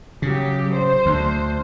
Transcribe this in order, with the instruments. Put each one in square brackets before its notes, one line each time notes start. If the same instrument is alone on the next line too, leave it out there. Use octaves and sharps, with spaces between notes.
[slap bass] C#3 [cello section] F#3 G4
[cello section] C5
[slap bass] D2